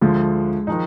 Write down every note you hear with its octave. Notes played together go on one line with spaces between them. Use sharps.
D2 D3 F3 G#3
D#3 F3 G#3 D#4